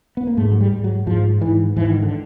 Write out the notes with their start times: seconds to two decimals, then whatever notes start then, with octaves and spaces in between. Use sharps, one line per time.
0.17 B3
0.27 A#3
0.37 G#2 A3
0.52 F#3
0.61 G3
0.72 G#2
0.84 F#3
1.07 G#2 F3
1.41 G#2 E3
1.76 G#2 E3
1.90 D#3
2.02 D3